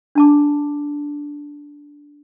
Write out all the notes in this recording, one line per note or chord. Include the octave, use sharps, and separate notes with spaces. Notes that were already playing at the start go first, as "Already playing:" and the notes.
D4 A5 D6